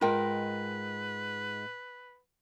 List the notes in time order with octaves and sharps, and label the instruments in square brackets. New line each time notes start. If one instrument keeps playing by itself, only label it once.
[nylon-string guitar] G#2 G#3 A#4 [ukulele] F4 G5 [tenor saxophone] B4